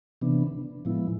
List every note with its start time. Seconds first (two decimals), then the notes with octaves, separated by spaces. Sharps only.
0.22 C3 E3 B3 D4
0.85 A2 F3 G#3 B3 E4